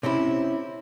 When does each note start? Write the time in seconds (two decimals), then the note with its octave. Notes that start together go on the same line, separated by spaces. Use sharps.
0.03 C3 C4 C#4 E4